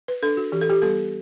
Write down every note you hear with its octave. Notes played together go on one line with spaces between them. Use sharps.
B4
D4 A4
F#4
E3 G4
A4
G4
G3 B3 A4